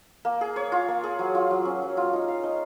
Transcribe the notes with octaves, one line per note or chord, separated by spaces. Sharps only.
A#3
G#4
C#5
F4
A#3
G#4
F#3
F4
F#3
C#4
F#3
F4
D#4
F5
D#4